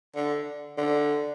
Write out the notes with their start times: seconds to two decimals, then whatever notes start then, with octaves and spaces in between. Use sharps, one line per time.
0.16 D3
0.78 D3